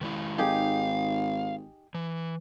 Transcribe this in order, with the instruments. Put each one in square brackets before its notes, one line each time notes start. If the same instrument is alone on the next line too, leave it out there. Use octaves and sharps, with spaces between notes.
[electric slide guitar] D#3 G#3 E4
[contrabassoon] G#1 [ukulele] D#4 G4 G#4 [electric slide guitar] F5
[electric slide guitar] E3